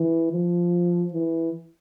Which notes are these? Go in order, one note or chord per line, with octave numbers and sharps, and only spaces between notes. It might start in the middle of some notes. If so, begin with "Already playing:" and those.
Already playing: E3
F3
E3